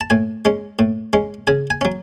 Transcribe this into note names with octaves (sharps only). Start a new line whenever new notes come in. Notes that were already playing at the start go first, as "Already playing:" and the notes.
A5
A2 G#5
G#3 C#4
A2
G#3 C#4
C#3 G#5
G#5
F#3 C#4